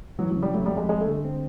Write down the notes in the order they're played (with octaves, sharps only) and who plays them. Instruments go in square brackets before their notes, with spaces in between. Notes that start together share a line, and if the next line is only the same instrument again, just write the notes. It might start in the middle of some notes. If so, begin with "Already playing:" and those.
[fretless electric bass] E3 [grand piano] F#3
[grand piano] F#3
[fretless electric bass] C#3
[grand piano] G3
[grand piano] F#3 [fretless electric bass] A3
[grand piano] G3
[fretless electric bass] F2
[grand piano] G#3
[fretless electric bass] G3 [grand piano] G#3
[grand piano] A3
[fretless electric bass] D3
C4